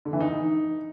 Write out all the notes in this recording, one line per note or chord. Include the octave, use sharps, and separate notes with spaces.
D3
E3
D#4